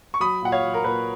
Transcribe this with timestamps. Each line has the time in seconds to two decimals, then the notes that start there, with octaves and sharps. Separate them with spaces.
0.14 C#6
0.20 F#3 B5 D#6
0.42 A#2 F#5
0.52 C#5 F5
0.63 F#3
0.74 A#4
0.84 A#2 B4